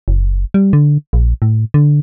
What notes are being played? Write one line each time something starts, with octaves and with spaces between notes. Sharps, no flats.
F#1
G3
D3
A#1
A2
D3